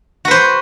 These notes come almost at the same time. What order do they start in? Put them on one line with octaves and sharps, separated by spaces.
F#4 B4 C5